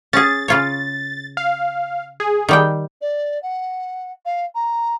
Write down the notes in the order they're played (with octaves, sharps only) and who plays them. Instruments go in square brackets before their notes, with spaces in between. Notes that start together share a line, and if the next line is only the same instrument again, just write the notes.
[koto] C#4 G#4 [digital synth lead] A6
[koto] C#3 F4 C#5
[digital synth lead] F5
G#4
[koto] D#3 G3 G5
[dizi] D5
F#5
F5
A#5